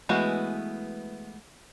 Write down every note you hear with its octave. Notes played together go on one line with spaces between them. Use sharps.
E3 G#3 A3 B3 F#4